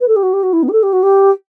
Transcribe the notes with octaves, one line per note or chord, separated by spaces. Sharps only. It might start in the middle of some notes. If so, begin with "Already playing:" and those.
B4
A4
G4
F#4
G4
F#4
E4
B3
G4
A4
G4
F#4
G4